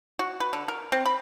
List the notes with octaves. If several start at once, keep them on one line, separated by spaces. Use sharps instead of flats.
F#4
B4
D3
A#4
C4
B5